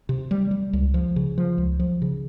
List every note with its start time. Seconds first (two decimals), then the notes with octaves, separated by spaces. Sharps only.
0.09 C3
0.31 G3
0.51 G3
0.73 C#2
0.94 F3
1.16 C#3
1.38 F3
1.58 C#2
1.79 F3
2.02 C#3